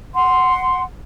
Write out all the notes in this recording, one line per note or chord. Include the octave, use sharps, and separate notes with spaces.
F#5 C6